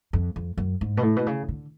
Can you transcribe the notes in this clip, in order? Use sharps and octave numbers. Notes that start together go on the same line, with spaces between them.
F2
F2
F#2
G#2
B2
A2
B2
C#3
D3